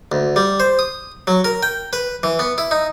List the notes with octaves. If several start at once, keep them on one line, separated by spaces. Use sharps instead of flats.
D2
G3
C5
D#6
F#3
A#4
G5
B4
E3
B3
E4
D#4